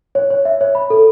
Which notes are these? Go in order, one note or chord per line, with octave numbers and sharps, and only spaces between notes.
C#5
C#5
E5
C#5
B5
A4